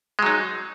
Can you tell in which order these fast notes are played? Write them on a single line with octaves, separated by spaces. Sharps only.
G#3 F#3 D#4